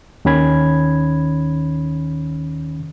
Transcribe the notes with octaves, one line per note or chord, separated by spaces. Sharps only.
D#2 D#3 C#4 B5 G#6